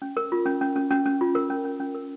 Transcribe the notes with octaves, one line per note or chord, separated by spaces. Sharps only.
C#4
A#4
F4
C#4
C#4
C#4
C#4
C#4
F4
A#4
C#4
C#4
C#4
A#4